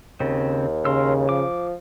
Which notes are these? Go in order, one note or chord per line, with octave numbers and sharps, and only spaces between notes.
D#2 C#3 C4
C#3 A#4 C6 E6
F3 D6